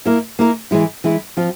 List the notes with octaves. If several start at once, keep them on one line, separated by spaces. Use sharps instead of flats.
A#3 E4 A#4
A#3 E4 A#4
E3 G#3 E4
E3 G#3 E4
F3 C4 F4